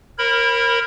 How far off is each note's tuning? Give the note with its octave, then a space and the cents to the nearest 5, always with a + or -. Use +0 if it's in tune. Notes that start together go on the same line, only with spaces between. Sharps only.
A#4 +0 C#5 -45 B5 +0